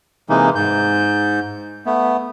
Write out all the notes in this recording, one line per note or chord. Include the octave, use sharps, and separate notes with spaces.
C3 E3 G#3 A#3 D#4
G#2 G6
A3 B3